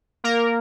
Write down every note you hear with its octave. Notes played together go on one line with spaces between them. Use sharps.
A#3 A#4